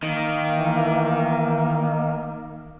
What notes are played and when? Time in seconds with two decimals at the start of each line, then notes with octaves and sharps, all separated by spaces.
0.03 D#3 A#3
0.56 E3